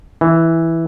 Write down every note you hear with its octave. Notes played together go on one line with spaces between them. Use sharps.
E3